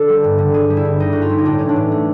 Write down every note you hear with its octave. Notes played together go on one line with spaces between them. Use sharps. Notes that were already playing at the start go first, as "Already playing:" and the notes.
Already playing: D3 A4
G3
G2
D3
G2 G#4
G3
E4
G2
D3 D#4
G2 F#4
F4
G3 E4
D#4
A2 D4
E3 C#4
D4
A2
A3